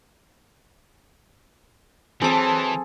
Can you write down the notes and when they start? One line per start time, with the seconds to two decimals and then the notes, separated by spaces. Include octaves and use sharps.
2.22 E3 F#3 C4 G#4 A4 C5 A5 D6